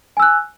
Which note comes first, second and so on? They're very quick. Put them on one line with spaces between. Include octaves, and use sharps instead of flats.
G#5 E6 F#6